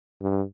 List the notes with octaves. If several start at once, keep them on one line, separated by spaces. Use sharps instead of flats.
G2